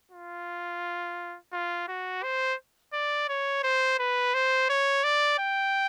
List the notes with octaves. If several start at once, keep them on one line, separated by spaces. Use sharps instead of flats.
F4
F4
F#4
C5
D5
C#5
C5
B4
C5
C#5
D5
G5